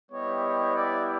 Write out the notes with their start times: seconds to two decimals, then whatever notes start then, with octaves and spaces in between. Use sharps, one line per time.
0.11 G3 B3 E4 G4 C#5 D#5
0.75 D5 E5